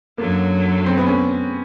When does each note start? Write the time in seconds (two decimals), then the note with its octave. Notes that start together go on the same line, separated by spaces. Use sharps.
0.18 F#2 D3 F#3 A#3
0.86 C4
0.98 B3
1.07 C#4